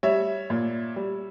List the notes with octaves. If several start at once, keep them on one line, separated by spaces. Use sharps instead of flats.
G3 C#5 E5
A#2
G3